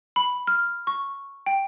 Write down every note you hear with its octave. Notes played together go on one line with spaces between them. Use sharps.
B5
F6
C#6
G5